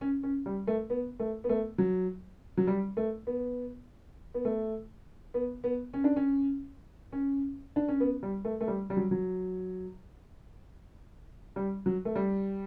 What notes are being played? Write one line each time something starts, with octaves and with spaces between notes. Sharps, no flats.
C#4
C#4
G3
A3
B3
A3
B3
A3
F#3
F#3
G3
A3
B3
B3
A3
B3
B3
C#4
D4
C#4
C#4
D4
C#4
B3
G3
A3
A3
G3
G3
F#3
F#3
G3
F#3
A3
G3